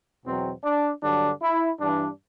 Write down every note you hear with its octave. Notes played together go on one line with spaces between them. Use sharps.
E2 B2 F#3 C4
D4
G2 D3 F#3 D4
E4
G2 E3 D4